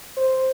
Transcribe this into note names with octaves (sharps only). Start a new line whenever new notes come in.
C5